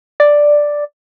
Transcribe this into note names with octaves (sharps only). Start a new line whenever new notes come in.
D5